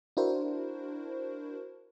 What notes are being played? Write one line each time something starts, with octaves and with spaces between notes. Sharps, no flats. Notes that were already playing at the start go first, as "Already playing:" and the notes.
D4 E4 F#4 A#4 C5